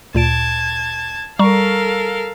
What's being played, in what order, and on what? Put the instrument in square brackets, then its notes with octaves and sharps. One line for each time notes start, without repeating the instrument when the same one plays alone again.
[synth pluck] D2 A#2 D7 [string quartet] A5 G#6
[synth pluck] G3 A#5 C#6 [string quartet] A4 A#4 F5